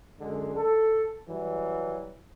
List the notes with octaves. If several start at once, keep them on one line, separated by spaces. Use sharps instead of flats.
F#2 D3 G#3
A4
E3 F#3 G3